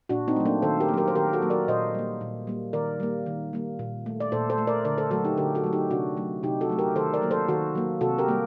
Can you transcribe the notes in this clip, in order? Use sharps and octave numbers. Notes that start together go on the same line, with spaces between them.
A#2 D4 F#4
C4 D#4
F#3 A3
A#3 D4
D#3 A4 C5
G4 A#4
A#3
F#3 G4 A#4
C5
D#3 G4 A#4
F#4 A4
F#3 A#3
A#4 D5
A#2 C5 D#5
G3 A#3
A#2
G3 A#3
D#3 A#4 D5
G3 A#3
D#3
G3 A#3
A#2
A3
D5
A#2 A4 C5
A4 C5
A3
A#4 D5
D3 A#4 D5
A4 C5
F#3 A3 F#4 A4
D#4 G4
D3 G4 A#4
F#4 A4
F#3 A3
D#4 G4
C3 D4 F#4
F#3 A3
C3 D#4 G4
F#4 A4
F#3 A3
G4 A#4
D#3 A4 C5
A#4 D5
F#3 A#3
A4 C5
D#3 F#4 A4
F#3 A#3
C3 F#4 A4
G4 A#4
G3 A#3